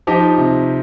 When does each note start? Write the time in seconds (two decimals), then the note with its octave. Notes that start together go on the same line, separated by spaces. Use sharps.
0.07 F3 D#4 G4
0.38 C3